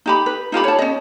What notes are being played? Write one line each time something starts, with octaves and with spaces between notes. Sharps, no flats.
D#4 G4 B5
B4
D#4 F4 G4 B5
C#5 A5
C#4 D#5